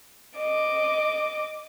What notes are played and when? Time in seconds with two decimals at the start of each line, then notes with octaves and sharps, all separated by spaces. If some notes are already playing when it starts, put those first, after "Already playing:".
0.38 D#5 D6